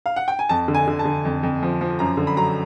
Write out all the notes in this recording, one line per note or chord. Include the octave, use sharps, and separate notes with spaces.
F5
F#5
G5
G#5
F2 A5
D3
G#5
D3
A5
D3
F2
F2
F3
F3
F#2 A#5
D3
B5
F#3 A#5